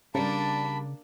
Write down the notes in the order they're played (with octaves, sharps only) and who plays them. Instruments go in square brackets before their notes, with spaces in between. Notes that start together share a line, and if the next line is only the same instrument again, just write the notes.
[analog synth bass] C#3 [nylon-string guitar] G3 A#4 [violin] A#3 D4 [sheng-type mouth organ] A5 B5